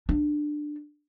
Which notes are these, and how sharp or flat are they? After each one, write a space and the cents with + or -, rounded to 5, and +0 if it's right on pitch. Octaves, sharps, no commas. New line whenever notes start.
D4 +15